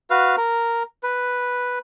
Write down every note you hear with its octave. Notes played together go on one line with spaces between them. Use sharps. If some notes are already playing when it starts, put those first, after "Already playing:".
F#4 B4 F5
A#4
B4